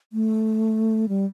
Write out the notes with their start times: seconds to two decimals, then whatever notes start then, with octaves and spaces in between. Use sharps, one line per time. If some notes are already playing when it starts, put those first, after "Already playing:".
0.13 A3
1.09 G3